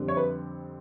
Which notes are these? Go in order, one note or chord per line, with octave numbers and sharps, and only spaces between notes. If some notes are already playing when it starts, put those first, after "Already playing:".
Already playing: F2 D3 G3 C4
C#5
B4